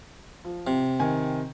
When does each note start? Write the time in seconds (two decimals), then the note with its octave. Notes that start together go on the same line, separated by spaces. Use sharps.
0.45 F3
0.67 C3
0.99 D#3 G#5